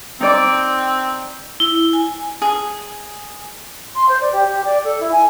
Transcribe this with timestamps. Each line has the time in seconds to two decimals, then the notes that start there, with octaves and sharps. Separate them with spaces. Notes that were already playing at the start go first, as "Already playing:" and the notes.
0.21 C4 D#4 D5 D6
1.60 E4
1.93 G#5
2.42 G#4
3.95 C6
4.08 C5
4.21 D5
4.32 G4
4.47 G4
4.64 D5
4.84 A4
5.00 E4
5.12 G#5